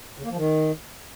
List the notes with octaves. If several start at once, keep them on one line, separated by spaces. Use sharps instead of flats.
C#3
A#3
F3
D#3